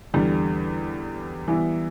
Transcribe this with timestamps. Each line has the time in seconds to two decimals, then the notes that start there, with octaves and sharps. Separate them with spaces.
0.14 E2 D3 G3
1.48 E3 G3 B3 E4